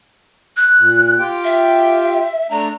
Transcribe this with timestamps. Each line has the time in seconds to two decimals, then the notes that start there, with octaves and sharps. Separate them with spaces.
0.57 F#6
0.79 A#2
1.19 F4 G4 G5
1.44 E5
2.51 A3 D4 A#5